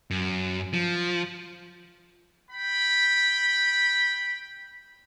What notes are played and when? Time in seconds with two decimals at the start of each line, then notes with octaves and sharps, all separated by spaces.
0.11 F#2
0.73 F3
2.51 G5 B5